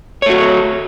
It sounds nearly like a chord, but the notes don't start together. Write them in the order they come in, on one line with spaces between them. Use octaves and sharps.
C#5 A3 F#4